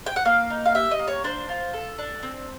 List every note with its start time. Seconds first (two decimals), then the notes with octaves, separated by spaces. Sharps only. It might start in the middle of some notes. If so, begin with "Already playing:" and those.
0.06 G5
0.16 F#5
0.25 A#3 F5
0.50 D#4
0.65 F5
0.75 G4 E5
0.91 D#5
0.99 A#3
1.08 C#5
1.24 D4 C5
1.49 F4
1.73 A4
1.98 D4
2.23 C4